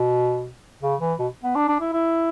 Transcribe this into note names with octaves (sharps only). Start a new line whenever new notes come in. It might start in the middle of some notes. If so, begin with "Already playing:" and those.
Already playing: B2
C#3
E3
B2
B3
D4
D4
E4
E4